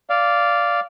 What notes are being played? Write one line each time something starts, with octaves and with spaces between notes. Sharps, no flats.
D5 F5